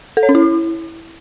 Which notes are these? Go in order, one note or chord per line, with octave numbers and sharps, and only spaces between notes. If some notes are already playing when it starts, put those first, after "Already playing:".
A4
C#5
C#4
E4